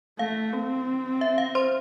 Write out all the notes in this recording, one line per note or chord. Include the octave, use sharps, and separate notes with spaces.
A3 F5
C4
E5
F5
C5 C6